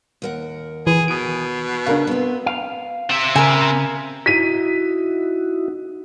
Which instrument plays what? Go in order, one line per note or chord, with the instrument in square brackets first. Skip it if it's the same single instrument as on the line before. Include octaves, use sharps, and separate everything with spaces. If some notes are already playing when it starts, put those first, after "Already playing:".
[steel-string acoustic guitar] D#2 A#4 F#5
[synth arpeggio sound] E3 B4 [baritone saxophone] G#4
[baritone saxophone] B2 [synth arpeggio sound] D#6 D7
[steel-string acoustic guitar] C#3 [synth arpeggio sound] D4 A#4 F5
[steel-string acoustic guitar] B3 C4
[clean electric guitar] F5
[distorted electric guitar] C4 E5
[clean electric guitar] C#3 [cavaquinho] A#4 G#5
[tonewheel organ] D#4 E4 F#4 [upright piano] B6 D#7